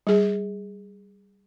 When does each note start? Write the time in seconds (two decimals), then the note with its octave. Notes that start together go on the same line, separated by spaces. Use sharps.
0.07 G3 G#4